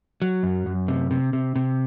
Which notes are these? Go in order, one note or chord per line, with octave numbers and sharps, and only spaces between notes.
F#3
F#2
F#2
C3
C3
C3
C3